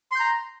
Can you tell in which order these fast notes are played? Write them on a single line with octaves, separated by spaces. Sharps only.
C6 G6 A#5